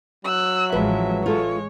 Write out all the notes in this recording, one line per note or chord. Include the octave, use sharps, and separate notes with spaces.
F#3 E6 F#6
A1 F3 G#3 B4 E5
G#3 F4 A4 C#5 E5